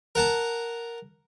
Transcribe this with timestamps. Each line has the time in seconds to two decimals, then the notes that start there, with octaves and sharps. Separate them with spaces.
0.15 A#4 F#5 A5 A#5